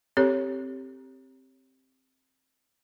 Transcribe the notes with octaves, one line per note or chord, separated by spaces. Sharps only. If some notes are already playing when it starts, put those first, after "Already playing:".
C4 G4 A4 C#5